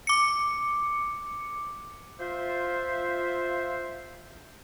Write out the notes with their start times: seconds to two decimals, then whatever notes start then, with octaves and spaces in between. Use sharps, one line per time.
0.07 D6 C#7
2.20 F4 C5 E5